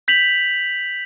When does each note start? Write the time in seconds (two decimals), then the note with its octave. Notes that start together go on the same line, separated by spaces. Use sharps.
0.08 G6 B6 F7 F#7